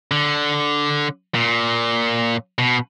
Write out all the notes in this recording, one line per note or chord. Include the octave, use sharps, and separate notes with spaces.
D3
A#2
B2